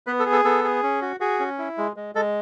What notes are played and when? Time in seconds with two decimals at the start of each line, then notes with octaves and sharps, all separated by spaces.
0.07 B3 B4
0.19 A4
0.26 G#4
0.32 A4
0.44 B3 A4
0.64 G#4
0.83 C#4
1.02 F#4
1.20 F#4 G#4
1.39 C#4
1.58 E4
1.78 G#3
1.96 G#3
2.15 G#3 A4